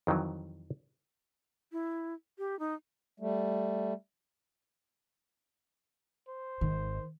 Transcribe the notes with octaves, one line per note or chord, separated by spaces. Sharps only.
F2 D#3 E3 F#3
E4
G4
D#4
G3 A3
C5
G#1 G#2 D#3